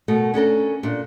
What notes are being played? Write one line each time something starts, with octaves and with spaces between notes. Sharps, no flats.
B2 A3 A#4
C#4 D4 A4 A#4
A#2 D4